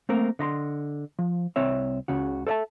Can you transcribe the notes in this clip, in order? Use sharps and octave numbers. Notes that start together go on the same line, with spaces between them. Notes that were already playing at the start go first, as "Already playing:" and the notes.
A3 A#3 C4 A#4
D3 D#5 B5 C6
F3
C2 C4 C#5 E5
C#2 C#3 F#4
A4 C5 D5 E5 A5